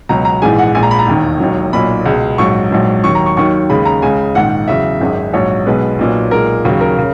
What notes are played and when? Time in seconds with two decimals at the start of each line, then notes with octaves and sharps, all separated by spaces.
0.09 C#2 B2 F#3 A#5
0.25 A#5
0.42 A#1 G#2 E3 G#3 G#5
0.59 F#5
0.75 A#1 A#2 G#3 G#5
0.83 A#5
0.91 B5
0.99 A#5
1.07 E1 D#2 D#3
1.40 E1 D#2 D#3 F#3
1.73 B1 A#2 F#3 B5
2.06 C#2 B2 G#3
2.38 A#1 G#2 F#3 C#6
2.71 A#1 G#2 F#3
3.04 D#2 D#3 F#3 C#6
3.15 A#5
3.26 C#6
3.37 D#2 D#3 F#3 C#6
3.70 D#2 C#3 G#3 B5
3.85 A#5
4.02 C#2 C#3 G#3 G#5
4.35 A#1 G#2 D#3 F#5
4.68 E2 C#3 F#3 E5
5.01 G#1 F#2 D#3 G#3
5.33 A#1 G#2 F#3 C#5
5.67 B1 B2 G#3 B4
5.99 B1 A#2 F#3
6.31 B1 A#2 G#3 A#4
6.65 D#2 C#3 F#3
6.81 A#4
6.99 C#3